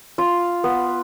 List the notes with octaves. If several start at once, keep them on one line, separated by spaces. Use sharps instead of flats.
F4
B3